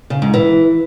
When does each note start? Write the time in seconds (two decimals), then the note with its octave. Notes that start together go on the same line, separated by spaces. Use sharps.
0.10 C#3
0.22 G#2
0.34 E3